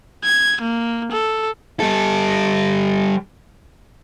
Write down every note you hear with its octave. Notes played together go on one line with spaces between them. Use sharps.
G#6
A#3
A4
G3 A4